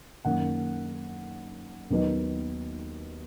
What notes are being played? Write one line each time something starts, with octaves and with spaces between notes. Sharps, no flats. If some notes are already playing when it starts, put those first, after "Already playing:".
F#2 D#3 A#3 F#5
D#2 D#3 F#3 B3 D#4